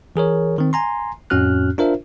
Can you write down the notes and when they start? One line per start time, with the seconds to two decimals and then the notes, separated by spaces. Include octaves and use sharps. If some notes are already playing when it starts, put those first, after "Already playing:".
0.16 E3 G#4 A#4 C#5
0.58 D#3 C4
0.73 G#5 A#5 C6
1.30 F2 A2 C#4 F#4 F6 F#6
1.78 D4 F4 A#4 C5 E5